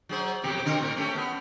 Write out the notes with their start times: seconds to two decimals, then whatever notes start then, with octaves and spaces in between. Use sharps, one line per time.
0.09 F#3 G#4 C5
0.44 F2 B2 G4
0.65 D3 C4 A#4
0.81 A2 A#4
0.97 A3 C#4 G4
1.15 B3